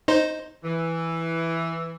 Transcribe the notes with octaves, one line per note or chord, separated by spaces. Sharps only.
D#4 C5
E3